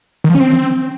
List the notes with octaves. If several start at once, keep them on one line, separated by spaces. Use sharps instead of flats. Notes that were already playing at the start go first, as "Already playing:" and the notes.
D#3
F3
C#4
C4